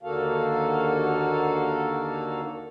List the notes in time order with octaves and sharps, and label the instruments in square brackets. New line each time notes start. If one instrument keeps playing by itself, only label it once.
[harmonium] D#2 D3 A#3 F#4 A4 F5